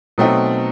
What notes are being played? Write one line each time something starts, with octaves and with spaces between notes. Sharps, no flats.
B2 F#3 A3 C4 D#4